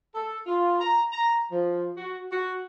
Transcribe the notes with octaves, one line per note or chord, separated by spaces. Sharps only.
A4
F4
A#5
A#5
F3
F#4
F#4